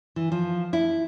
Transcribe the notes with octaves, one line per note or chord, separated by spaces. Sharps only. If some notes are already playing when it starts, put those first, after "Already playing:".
E3
F3
E4